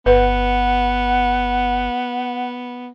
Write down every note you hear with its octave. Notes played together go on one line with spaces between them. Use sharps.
G1 B3 B4 F#5